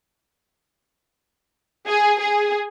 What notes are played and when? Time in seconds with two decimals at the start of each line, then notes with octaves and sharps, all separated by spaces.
1.87 G#4
2.20 G#4